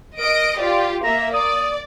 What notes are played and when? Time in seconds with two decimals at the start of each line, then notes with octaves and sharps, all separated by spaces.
0.19 A#4 D#5 D7
0.58 F4 G4 D5
1.04 A#3 E5 A#5
1.34 D5 D#6